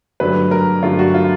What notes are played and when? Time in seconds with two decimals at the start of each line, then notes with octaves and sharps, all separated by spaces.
0.20 G2 D3 F#3 A3 B4
0.51 A#4
0.83 G2 D3 F#3 A3 F4
0.99 F#4
1.14 F4